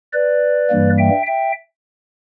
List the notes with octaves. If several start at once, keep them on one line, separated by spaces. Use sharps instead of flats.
B4 D5
G2 E3 G3 A#3
E5 G5
E5 G5